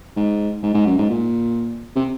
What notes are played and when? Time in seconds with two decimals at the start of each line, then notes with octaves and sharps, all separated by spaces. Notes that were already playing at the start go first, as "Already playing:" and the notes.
0.16 G#2
0.63 G#2
0.74 G#2
0.86 F#2
0.98 G#2
1.10 A#2
1.96 C3